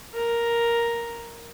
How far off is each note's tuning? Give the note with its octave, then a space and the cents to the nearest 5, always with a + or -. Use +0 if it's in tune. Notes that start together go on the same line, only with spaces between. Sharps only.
A#4 +5